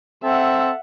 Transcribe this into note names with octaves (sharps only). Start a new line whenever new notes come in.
C4 A4 E5 F#5